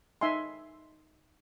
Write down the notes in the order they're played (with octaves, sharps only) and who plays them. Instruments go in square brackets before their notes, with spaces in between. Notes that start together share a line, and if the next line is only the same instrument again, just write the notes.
[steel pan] D#4 E5 G#5 C6